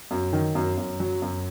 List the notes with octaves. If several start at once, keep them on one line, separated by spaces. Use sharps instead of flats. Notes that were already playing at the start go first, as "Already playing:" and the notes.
F#2
D#3
F#2
F#2
F#3
F#2